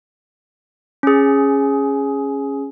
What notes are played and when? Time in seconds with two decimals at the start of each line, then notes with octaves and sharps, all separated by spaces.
1.03 C#4 G#4